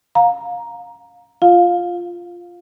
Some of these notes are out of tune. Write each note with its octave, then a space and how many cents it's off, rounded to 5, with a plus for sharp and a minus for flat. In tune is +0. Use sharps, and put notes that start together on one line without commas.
F5 +25 A#5 +10
F4 +0 F5 +15